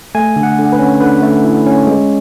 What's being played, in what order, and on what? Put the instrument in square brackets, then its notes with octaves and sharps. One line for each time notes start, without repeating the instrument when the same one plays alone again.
[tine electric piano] A3 G#5
D3
F#5
D3
B4
C#4
D3 B4
A3
E4
C#4
G#3